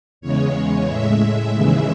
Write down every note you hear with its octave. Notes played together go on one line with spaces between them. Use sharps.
E2 C#3 G#3 C#5
A2 G#3 E5
D#2 C#3 E3 G#3